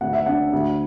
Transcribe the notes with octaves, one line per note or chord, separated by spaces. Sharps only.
D2 F#5
E5
D4 F#5
D2